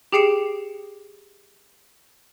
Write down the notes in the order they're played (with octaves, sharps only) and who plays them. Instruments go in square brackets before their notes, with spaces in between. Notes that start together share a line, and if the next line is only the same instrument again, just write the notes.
[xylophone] G4 G#4 G5 C7 C#7 E7